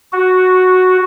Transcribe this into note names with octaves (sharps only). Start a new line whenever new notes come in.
F#4